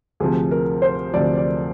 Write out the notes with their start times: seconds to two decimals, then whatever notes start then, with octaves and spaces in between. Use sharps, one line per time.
0.20 D2 C3 F3 G#4
0.51 A#4
0.82 C5
1.13 D2 C3 F3 D5
1.37 D5